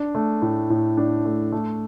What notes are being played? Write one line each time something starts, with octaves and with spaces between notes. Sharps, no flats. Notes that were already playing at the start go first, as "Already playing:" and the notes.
Already playing: D4
A3
A2
A2
D4
A3
A3